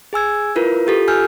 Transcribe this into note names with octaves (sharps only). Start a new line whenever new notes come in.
G#4 G#5 E6 G#6
E4 F4 A#4 B4
F4 G4 A4
G#5 E6 F6 G6